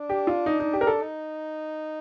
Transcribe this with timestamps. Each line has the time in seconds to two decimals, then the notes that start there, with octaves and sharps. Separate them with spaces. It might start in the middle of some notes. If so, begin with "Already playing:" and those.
Already playing: D4
0.09 G4
0.27 F4
0.46 D#4
0.60 D#4
0.73 G4
0.81 A#4
0.87 A4
1.01 D#4